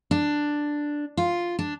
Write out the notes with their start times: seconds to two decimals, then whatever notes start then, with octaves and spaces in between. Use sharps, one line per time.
0.11 D4
1.17 F4
1.59 D4